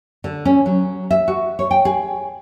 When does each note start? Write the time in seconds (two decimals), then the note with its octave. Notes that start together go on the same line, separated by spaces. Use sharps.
0.24 D3
0.45 C#4
0.66 F#3
1.11 E5
1.28 F#4
1.59 C#5
1.71 G5
1.85 G#4